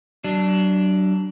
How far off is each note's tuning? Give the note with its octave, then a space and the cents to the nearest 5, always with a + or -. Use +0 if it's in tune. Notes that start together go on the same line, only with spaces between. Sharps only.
F#3 +35 D4 +0